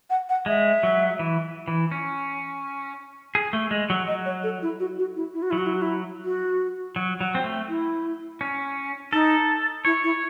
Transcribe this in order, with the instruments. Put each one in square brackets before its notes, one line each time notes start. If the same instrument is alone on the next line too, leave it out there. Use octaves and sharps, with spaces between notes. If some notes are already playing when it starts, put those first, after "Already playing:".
[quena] F#5
F#5
[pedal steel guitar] G#3 [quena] E5
[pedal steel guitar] F#3
E3
E3
C#4
G#4
A3
G#3
F#3
[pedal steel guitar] F#3 [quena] D#5
[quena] C#5
A4
E4
F#4
F#4
E4
E4
F#4
[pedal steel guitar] F#3 [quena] E4
[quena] F#4
E4
F#4
E4
F#4
[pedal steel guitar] F#3
F#3
C4
A3
[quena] E4
[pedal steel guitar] C#4
[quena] D#4 [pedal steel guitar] A4
[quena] E4 [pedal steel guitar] C#5
[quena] E4